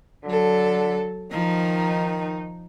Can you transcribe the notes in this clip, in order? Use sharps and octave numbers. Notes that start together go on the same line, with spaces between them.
D3 F#3 A4
D#3 F3 D#4